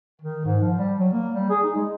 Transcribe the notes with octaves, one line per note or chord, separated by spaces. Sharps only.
D#3
G#2
F3
G3
F#3
A#3
G3
G#4
D#4
G#3